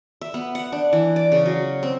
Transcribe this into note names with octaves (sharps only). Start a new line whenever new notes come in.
E5
B3
F#5
D4
E3
D5
C#3
F#3
C4